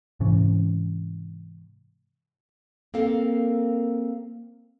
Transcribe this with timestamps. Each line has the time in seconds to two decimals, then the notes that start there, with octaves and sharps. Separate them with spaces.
0.20 G#2 C3 E3 C#4
2.94 A#3 C4 A4 A#4 F5